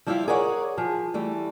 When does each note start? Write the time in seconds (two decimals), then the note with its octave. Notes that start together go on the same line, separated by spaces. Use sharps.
0.07 F3 G3 E4 G4 E5 F5
0.28 G#4 A#4 C#5 D5 F#5
0.78 F3 G#4
1.14 E3 G3 A3